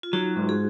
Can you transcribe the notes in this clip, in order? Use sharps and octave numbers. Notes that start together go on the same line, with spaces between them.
F4
F#3 D#4 F#4
G#2
G#4